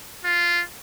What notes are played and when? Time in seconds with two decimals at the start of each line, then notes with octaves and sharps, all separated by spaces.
0.24 F4